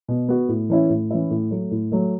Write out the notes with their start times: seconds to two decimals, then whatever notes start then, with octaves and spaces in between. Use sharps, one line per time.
0.08 B2
0.28 B3 F#4
0.49 A2
0.70 E3 C#4 E4
0.90 A2
1.11 E3 C#4 E4
1.31 A2
1.51 F#3 A3
1.71 A2
1.92 F#3 A3